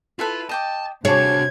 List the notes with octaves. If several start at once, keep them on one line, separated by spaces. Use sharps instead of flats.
E4 F4 A4 B4
D#5 G5 A5 D6
C3 D4 F#4 G#4 C#5 A5 D6 G#6